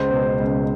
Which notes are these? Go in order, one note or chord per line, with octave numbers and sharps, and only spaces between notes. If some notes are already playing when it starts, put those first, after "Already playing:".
Already playing: C#2 C5
B2
C#2